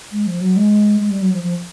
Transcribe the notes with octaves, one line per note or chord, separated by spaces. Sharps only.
G#3
F3
F#3
G#3
G#3
G3
F#3
F3
F3